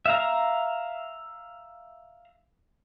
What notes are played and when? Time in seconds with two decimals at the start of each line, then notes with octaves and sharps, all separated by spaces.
0.06 E5 F5 A#5